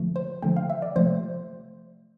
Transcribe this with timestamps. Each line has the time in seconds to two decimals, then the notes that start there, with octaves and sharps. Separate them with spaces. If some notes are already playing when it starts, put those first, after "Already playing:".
Already playing: D3 F3 A3
0.16 C5
0.42 D3 F3 A3 G5
0.56 F5
0.70 E5
0.82 D5
0.96 C3 F3 A3 C5